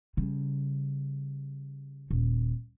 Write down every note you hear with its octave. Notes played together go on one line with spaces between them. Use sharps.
C#3 G3
D#1